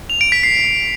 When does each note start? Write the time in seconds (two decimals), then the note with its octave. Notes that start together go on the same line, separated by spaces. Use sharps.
0.10 F7
0.21 D7
0.32 B6
0.43 C7